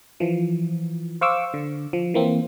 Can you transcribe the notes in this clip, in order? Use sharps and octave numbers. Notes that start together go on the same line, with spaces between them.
E3 F3
C5 F5 C#6 D6 E6
D3
F3
E3 A#3 C4